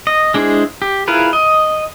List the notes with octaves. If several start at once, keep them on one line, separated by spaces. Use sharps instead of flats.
D#5
G#3 D4 E4 G#4 C5
G4
E4 F4 G#4 A#4 B4
D#5